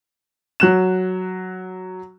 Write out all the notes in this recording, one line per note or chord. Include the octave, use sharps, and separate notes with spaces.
F#3 F#6 E7